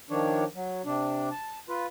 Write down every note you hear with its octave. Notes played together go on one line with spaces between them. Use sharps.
D#3 F3 D4 C#5
F#3
C3 D4
A5
F4 B4